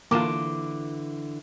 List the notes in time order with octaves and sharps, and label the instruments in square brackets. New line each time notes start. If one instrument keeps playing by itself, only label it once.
[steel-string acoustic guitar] D3 E3 [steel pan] A#3 F4 [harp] D6 E7